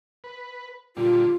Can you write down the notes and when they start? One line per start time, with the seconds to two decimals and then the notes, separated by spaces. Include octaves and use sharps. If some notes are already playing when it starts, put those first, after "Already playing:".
0.24 B4
0.97 A#2 D3 G3 F4